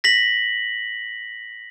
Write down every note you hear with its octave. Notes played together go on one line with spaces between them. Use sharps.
A#6 B6 F#7